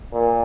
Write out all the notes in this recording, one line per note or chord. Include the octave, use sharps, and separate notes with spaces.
A#2